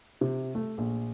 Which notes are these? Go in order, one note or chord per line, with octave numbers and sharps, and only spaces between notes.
C3
A3
A#1